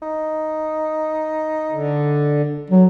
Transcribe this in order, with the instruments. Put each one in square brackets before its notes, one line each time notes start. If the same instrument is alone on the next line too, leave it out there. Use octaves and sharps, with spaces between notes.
[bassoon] D#4
[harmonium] D3
[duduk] F#3